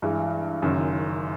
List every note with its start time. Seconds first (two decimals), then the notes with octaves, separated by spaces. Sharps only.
0.02 G2 E3 G#3
0.62 F#1 F#2 D#3